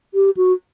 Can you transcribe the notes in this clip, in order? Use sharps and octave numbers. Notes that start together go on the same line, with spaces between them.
G4
F#4